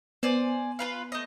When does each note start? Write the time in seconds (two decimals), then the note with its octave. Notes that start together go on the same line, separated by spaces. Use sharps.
0.23 B3 C5 D5 G#5
0.79 F4 B4 F5
1.12 A3 D#5